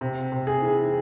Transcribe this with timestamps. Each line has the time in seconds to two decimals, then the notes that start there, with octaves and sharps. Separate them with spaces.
0.01 C3
0.32 C3
0.47 G#4
0.62 E3